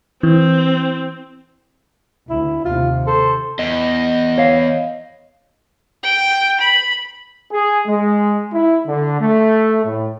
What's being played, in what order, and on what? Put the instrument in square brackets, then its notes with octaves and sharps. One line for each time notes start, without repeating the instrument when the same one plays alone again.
[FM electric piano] E3 [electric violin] C4
[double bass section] D2 [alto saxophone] E4
[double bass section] D#2 C3 [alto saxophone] F4
[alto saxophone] A4 [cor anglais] C5
[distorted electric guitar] E2 [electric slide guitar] D#5
[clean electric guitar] C#5 F5
[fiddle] G5
B5
[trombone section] G#4
G#3
E4
D3
A3
A2